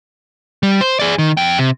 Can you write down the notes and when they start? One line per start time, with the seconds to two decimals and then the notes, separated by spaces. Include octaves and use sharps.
0.63 G3
0.81 C5
0.99 G#4 D5
1.19 D#3
1.37 F2 G5
1.58 C3